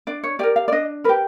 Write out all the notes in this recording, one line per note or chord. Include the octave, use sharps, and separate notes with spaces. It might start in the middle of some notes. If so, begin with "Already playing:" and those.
D4 D5
C#5
G4 A#4 D5
F5
D5
D4 D#5
G4 A#4 B4